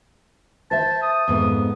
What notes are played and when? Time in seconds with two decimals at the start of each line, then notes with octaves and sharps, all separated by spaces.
0.71 C5 E5 A5
1.02 D#6
1.28 F2 G#2 B3